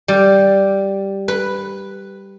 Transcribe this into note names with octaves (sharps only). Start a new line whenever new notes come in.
G3
B4